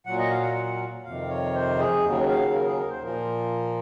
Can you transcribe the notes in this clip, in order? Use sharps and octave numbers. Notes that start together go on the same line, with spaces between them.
A#2 F#3 F#5
D#5
F5
F#5
F#5
F2 C3 D#3 F5
C#5
C5
G#4
D#2 C#3 F#3
F5
A#4
G#4
A#4
C5
A#2 F3 A#4